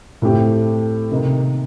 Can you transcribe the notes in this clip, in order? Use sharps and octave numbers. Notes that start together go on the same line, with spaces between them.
A2 A3 C4 G4
C3 D#3 A#3 D#4